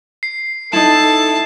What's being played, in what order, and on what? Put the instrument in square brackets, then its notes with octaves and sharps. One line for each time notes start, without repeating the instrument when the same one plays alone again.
[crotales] C7
[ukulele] D#4 E4 [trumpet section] A4 [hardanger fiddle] A5 [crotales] E7